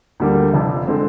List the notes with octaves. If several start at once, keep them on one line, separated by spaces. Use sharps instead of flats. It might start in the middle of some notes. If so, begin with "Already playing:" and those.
D2 D3 G3 A#3
F1 F2 C3
D3 G#3 C4